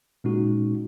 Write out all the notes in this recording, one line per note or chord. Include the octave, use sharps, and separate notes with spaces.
A#2 G#3 C#4 D#4 F#4